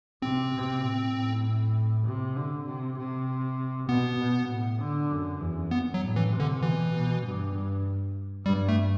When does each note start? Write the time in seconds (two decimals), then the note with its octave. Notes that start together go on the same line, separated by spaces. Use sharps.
0.22 C3 C4
0.53 C3
0.83 A2
1.14 A2
2.06 C3
2.36 D3
2.66 C3
2.97 C3
3.88 B2 B3
4.18 B2
4.49 A2
4.80 D3
5.10 F#2
5.41 E2
5.71 F#2 B3
5.94 F#3
6.02 A2
6.16 E3
6.32 C3
6.40 D3
6.62 B2 E3
6.92 B2
7.24 G2
7.54 G2
8.45 G2 G3
8.69 A3